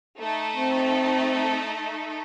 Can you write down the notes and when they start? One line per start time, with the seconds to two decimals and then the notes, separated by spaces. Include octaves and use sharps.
0.19 A3 D#4 A4
0.57 C4